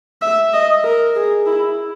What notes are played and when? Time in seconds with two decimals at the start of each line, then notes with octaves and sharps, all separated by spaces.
0.22 E5
0.53 D#5
0.84 A#4
1.15 G#4
1.46 E4